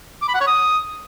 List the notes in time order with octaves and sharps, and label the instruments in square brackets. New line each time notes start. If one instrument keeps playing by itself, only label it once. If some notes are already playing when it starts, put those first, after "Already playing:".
[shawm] D6
B5
F#5
C#5
D#6